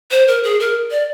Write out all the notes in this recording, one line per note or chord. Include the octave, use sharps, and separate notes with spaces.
C5
A#4
G#4
A#4
D5